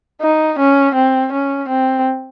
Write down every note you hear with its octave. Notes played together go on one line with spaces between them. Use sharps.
D#4
C#4
C4
C#4
C4